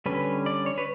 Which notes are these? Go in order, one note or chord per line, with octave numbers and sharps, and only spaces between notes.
D3 G3 C#4 B4
D5
C#5
B4